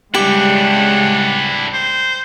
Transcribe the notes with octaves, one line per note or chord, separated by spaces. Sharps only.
C#3 G3 G#3 D4 E4 G4 F#5
C5